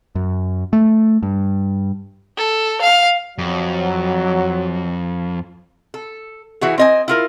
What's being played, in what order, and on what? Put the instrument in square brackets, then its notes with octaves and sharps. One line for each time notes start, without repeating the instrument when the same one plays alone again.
[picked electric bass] F#2
A3
G2
[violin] A4
F5
[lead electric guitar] F2 [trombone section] F#3
[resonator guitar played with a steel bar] A4
E3 E4 F#4 G#4
C4 D#5 G#5
E4 F4 A#4